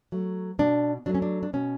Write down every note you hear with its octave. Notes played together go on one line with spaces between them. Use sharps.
F#3 A3
B2 D4
F#3 A3 D4
C#4
D4
D4
B2 C#4